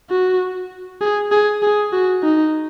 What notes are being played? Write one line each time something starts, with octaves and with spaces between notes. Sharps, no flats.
F#4
G#4
G#4
G#4
F#4
D#4